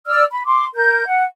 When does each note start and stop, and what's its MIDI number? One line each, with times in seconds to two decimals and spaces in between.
0.07 0.24 74
0.07 0.24 88
0.07 0.24 89
0.31 0.44 83
0.46 0.66 84
0.46 0.66 86
0.74 1.05 70
0.74 1.05 91
1.06 1.22 78